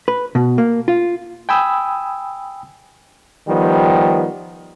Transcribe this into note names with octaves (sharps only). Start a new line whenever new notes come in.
B4
B2
A#3
F4
G5 G#5 B5 D#6 E6
D#3 F3 G3 B3